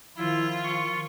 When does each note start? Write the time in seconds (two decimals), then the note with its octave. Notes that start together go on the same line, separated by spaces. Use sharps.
0.17 D#3 F3 E4 F4
0.63 C#6